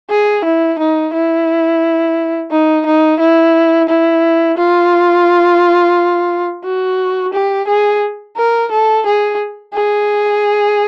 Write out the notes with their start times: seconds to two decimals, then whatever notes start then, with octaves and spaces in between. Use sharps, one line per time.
0.10 G#4
0.44 E4
0.79 D#4
1.13 E4
2.51 D#4
2.86 D#4
3.20 E4
3.89 E4
4.57 F4
6.64 F#4
7.33 G4
7.68 G#4
8.37 A#4
8.71 A4
9.06 G#4
9.74 G#4